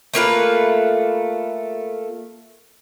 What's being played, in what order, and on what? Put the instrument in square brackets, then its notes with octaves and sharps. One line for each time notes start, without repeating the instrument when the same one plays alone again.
[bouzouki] A3 A#3 F4 B4